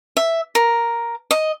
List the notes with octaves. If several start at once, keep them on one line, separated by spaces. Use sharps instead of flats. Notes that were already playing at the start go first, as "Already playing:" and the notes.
E5
A#4
D#5